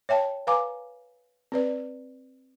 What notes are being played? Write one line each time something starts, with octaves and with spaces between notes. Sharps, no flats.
C#5 E5 G5 A5
B4 F5 G#5 A#5 D6
C4 B4 D5